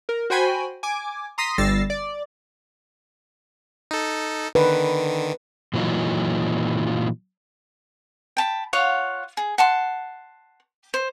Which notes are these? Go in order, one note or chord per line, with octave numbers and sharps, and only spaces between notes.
A#4
F#4 C5 G5 G#5 B5
G#5 D6
A#5 C6 D#6 A#6 B6
G1 G3 E6 A6 A#6 C7
D5
D#4 A4
D3 D#3 B4
A#2 E3 F#3 D#4 F4
G5 A5 B5
F4 C#5 F5 F#5
G#4
F#5 A5 C6
C5